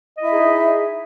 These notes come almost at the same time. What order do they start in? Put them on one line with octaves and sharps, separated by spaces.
D#5 E4 E5 G#4 D#4